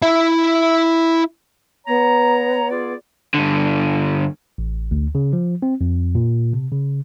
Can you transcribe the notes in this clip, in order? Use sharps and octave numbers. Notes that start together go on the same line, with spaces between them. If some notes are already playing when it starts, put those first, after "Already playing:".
E4 E5
B3 C#5 A#5
F4 G#4 D5
G2 D3
A1
D2
C#3
F3
C4
F2
A#2
C3
C#3